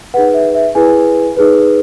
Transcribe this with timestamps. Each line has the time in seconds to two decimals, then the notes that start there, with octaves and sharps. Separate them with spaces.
0.14 B4 F#5
0.17 D#4 G#4
0.34 E5
0.55 E5
0.75 E4 G#4 B4 G#5
1.37 D#4 G#4 B4